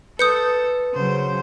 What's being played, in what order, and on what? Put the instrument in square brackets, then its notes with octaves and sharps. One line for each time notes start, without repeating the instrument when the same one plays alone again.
[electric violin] A4 [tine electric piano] B4 [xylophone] D#6 G6 C#7
[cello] C#3 F#3 [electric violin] C5